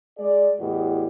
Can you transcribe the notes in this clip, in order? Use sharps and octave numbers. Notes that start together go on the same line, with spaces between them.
G#3 G#4 D5
E2 A2 F#4 G4 D#5